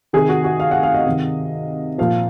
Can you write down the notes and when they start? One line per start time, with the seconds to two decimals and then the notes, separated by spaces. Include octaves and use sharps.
0.13 C3 D#3 G#4
0.29 F#4
0.44 F#4
0.60 F5
0.71 F#5
0.83 F5
0.94 D#5
1.06 C3 D#3
1.98 A#2 F3 F5